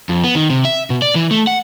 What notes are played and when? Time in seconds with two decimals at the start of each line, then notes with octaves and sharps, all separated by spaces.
0.09 F2
0.24 B3
0.35 D#3
0.50 C3
0.65 E5
0.90 B2
1.02 D5
1.15 E3
1.31 A3
1.47 F#5